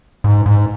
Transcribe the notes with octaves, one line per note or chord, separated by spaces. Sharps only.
G#2
G#2